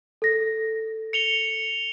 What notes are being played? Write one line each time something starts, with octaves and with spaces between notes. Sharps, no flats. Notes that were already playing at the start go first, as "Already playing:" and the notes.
A4 A#6
C#7 F7 G7